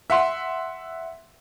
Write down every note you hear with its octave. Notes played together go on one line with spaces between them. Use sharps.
E5 F#5 C6